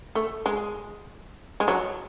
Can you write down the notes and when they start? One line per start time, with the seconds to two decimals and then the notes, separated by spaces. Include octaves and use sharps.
0.15 A3
0.46 G#3
1.60 G#3
1.68 F#3